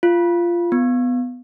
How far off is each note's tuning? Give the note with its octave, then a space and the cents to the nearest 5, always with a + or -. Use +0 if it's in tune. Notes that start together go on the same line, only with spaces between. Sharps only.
F4 -15
B3 +15